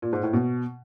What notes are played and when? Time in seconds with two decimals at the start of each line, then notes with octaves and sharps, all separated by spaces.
0.02 A#2
0.13 G#2
0.23 A2
0.33 B2